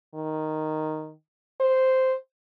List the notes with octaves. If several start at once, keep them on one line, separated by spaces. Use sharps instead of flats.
D#3
C5